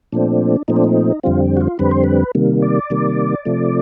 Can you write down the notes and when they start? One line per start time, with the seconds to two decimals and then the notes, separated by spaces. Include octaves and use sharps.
0.12 A#2 F3 A3 C4 D4
0.68 A#2 F3 A3 C4 D#4
0.76 D4
0.84 D#4
1.23 F2 D3 G3 C4 F4
1.57 F#4
1.61 F4
1.79 F2 D3 G3 C4 B4
1.91 C5
2.04 B4
2.35 C3 D#3 G3 A#3
2.62 D5
2.90 C3 D#3 G3 A#3
3.45 C3 F3 A3